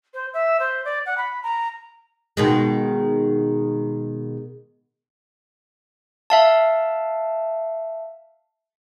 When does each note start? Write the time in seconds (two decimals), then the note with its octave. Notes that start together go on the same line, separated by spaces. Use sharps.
0.14 C5
0.33 E5
0.60 C5
0.85 D5
1.06 F#5
1.17 B5
1.43 A#5
2.37 B2 D#3 G#3
6.30 E5 F5 A5